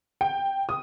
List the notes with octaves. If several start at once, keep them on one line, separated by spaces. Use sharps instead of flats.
G5
D#6